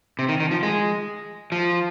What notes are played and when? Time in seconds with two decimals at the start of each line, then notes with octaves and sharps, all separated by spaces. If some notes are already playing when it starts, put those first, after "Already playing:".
0.19 C3
0.29 D#3
0.40 D#3
0.51 F3
0.63 G#3
1.52 F3